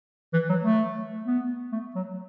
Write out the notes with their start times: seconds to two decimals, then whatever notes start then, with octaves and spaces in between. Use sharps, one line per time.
0.33 E3
0.49 F#3
0.64 A3
1.26 B3
1.72 A3
1.95 F#3